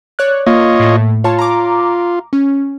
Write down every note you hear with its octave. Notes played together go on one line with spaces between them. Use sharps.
C#5 D5 F#6
A#3 F4 C#5 D#5
A2 A3
F4 C#5 A5
A#5 D6
C#4